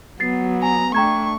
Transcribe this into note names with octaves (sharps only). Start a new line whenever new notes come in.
F#3 B3 A6 C7
G#5 A#5
A3 D4 G5 A#5 C#6 G#6